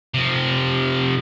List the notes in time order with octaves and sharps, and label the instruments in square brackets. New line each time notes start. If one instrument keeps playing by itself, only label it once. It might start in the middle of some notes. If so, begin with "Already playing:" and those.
[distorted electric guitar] C3 F3